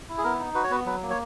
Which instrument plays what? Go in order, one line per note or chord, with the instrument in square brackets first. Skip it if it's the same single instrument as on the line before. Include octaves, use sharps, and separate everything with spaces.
[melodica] E4
G#4
B3 A#4
D#4
F#4 B4
C#5
B3 B4
F#3 B4
A#3
C#5